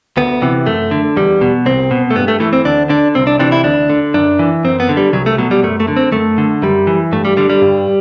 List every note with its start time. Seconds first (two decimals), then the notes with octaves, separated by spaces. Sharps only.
0.17 D2 B3
0.42 C3 E3
0.66 F#2 A3
0.91 D3
1.16 E2 G3
1.41 B2
1.66 C2 C4
1.91 B2
2.11 A3
2.15 G2 B3
2.28 A3
2.40 E3 A3
2.53 C4
2.65 D2 D4
2.89 D3 D4
3.15 C2 C4
3.27 D4
3.39 C3 E3 D4
3.52 E4
3.64 D2 D4
3.90 D3
4.14 F#2 D4
4.39 E3
4.64 F#2 C4
4.80 B3
4.89 D3
4.97 G3
5.13 C2 F#3
5.26 A3
5.38 B2 F#3
5.51 G3
5.63 F#2 A3
5.80 A3
5.88 D3
5.97 C4
6.12 F#2 A3
6.38 D3
6.62 F#2 G3
6.87 E3
7.12 G2 A3
7.25 G3
7.37 D3 G3
7.50 G3
7.62 G2